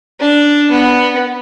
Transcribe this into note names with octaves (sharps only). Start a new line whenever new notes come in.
D4
B3